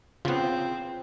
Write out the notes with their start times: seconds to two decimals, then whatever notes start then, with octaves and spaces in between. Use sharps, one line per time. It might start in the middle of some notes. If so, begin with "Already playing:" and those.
0.25 C#3 B3 C4 F4